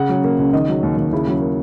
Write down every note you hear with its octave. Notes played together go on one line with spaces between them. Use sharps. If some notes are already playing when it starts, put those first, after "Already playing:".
Already playing: C#3 F#5
F#3
A#3
C#2
D#3 D#5
F#3
D#2
D#2
C#3 E4
F#3
A#3